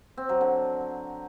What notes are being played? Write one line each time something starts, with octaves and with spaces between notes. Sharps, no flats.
C4
F#3
D3